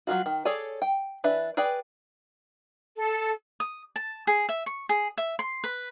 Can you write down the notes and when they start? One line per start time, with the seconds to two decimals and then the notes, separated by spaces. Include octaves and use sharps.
0.07 F#3 G#3 F4 F#4
0.26 D#3
0.45 G#4 A4 C#5 D5 G#5
0.82 G5
1.24 E3 D4 B4 E5
1.57 G#4 B4 D5 G5
2.95 A4
3.60 D#6
3.96 A5
4.27 G#4
4.49 E5
4.66 C#6
4.89 G#4
5.18 E5
5.39 C6
5.64 B4